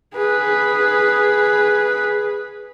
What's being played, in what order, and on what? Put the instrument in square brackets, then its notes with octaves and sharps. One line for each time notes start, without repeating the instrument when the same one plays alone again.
[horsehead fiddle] G#4 B4